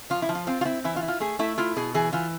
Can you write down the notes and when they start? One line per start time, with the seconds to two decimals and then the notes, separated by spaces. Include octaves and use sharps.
0.10 F3 F4
0.22 E4
0.29 F3
0.35 F4
0.47 C4 F4
0.61 F4
0.65 C4 E4
0.84 E3 E4
0.96 F4
1.02 E4
1.08 F4
1.20 A3 G#4
1.39 A3 E4
1.58 E4 F4
1.77 B2 G#4
1.94 E3 G#4
2.13 E3 F4